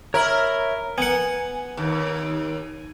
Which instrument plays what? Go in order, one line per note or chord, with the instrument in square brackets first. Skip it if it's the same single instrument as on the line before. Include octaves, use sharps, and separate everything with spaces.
[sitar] A#4 [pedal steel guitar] C#5 E5 B5
[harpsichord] B3 F#5 [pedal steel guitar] G#5
[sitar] D#2